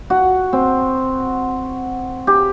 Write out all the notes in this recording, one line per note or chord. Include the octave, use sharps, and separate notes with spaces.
F#4
C4
G4